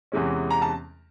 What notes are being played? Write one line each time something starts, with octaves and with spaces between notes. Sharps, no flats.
E2 C3 E3 G#3 C#4
A#5
A5